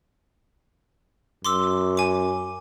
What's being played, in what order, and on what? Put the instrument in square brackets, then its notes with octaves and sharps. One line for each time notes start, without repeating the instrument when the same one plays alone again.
[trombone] F#2 [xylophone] C6 D6 E6
[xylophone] G#5 D6